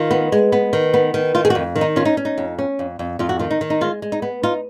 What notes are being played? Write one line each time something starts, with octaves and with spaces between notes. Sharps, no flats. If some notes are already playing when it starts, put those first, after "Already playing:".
Already playing: D#3 F4
B3
G#3
B3
D#3
B3
D#3
D#3 F4
G#4
F#4
F2
D#3
D#4
C#4 F4
D#4
C#4
D#4
F2
C#4
F2
F2
F2 F4
F#4
D#3 F4
D#4
D#3
D#4
G#3 F4
G#3
D#4
B3
D#4 F4